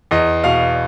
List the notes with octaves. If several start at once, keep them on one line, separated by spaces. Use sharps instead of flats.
E2 D#5
B2 F5